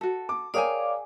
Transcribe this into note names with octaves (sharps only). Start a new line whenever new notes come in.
F#4 A4
D6
G#4 A#4 C#5 D5 F5 G5 G#5 D6